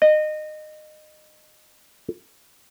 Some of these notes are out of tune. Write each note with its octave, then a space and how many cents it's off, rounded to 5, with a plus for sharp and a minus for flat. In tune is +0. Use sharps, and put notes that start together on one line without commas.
D#5 -25